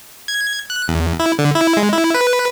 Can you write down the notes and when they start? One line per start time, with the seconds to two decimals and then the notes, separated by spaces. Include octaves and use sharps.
0.28 G#6
0.70 F#6
0.88 E2
1.20 E4
1.39 D3
1.55 E4
1.77 G#3
1.92 E4
2.15 B4